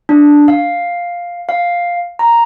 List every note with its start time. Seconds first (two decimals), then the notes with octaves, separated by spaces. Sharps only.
0.09 D4
0.48 F5
1.49 F5
2.19 A#5